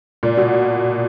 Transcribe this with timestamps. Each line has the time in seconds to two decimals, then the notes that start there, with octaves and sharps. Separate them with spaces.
0.23 A#2
0.37 B2